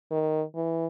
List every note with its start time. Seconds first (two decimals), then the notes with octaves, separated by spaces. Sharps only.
0.11 D#3
0.56 E3